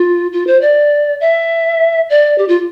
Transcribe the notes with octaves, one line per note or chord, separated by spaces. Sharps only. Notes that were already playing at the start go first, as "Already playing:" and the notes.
Already playing: F4
F4
C5
D5
E5
D5
G4
F4